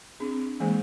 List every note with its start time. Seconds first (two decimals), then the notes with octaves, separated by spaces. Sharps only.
0.20 C4 D4 G#4
0.60 E3 G#3 A#3 G#4 C5